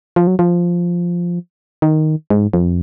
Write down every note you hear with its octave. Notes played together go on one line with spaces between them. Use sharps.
F3
F#3
F3
D#3
G#2
F2